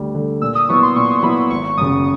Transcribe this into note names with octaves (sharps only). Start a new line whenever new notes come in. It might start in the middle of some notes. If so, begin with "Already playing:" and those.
Already playing: D2 D3 G3
D3 G3
A#2 E6
D#6
F#3 B3 E4 C#6
C6
A#2 C#6
C6
F#3 B3 E4 B5
G#1 C#6
F#2 C#3 D#6